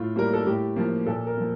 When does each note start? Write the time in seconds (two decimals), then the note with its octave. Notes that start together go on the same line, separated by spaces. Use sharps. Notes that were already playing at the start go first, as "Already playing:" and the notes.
Already playing: A2 F4
0.16 G3 A#3 A#4
0.33 A4
0.46 A2 G4
0.76 F3 A#3
1.06 A#2 A4
1.27 A#4
1.38 F3 A#3